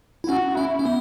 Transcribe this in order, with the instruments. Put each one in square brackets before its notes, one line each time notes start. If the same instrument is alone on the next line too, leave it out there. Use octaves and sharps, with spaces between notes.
[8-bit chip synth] E4
[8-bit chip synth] C#4 [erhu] F#4
[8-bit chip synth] C#4 [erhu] E4
[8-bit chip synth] C#4
B3